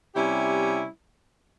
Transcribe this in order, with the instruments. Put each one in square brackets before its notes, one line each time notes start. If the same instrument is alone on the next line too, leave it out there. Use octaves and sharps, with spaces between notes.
[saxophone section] C3 G3 C#4 E4 G4